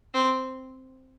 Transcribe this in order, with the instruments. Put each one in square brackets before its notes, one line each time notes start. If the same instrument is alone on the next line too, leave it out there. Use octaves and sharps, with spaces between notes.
[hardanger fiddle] C4